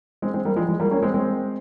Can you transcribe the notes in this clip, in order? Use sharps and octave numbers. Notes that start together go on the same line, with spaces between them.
G#3 C4
G#3 C4
G3 A#3
F3 G#3
F3 G#3
G3 A#3
A#3 C#4
G#3 C4
G#3 C4